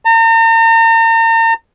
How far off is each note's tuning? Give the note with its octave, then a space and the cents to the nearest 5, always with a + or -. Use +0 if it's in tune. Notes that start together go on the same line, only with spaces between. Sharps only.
A#5 -40